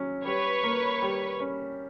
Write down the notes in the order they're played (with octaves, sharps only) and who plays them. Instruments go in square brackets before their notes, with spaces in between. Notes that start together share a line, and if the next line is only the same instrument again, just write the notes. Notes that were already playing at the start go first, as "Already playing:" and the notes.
Already playing: [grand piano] F#3 C#4
[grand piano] G3 [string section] B4 C#5
[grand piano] A#3
G3
C#4